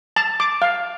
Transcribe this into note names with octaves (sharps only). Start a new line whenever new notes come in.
A5
D6
F5